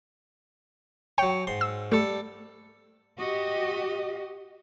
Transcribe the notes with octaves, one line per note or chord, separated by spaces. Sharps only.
F#3 C#5 G5
G#2 C6
E6
G3 A3 A4
F#4 G4 D#5